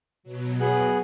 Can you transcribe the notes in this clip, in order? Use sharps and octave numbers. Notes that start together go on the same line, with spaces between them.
B2 F#3
B3 G#4 F#6